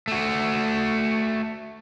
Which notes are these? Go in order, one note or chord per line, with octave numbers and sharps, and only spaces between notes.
A3 F#4